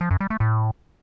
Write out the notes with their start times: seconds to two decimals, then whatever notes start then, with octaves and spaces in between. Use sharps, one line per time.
0.01 F3
0.11 F#2
0.20 G3
0.30 A3
0.40 A2